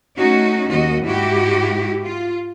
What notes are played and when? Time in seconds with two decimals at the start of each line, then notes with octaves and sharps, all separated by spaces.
0.17 A3 C#4 D#4 F#4
0.68 D#2 F#4 D#5
1.05 G#2 E4 F#4 G4
2.05 F4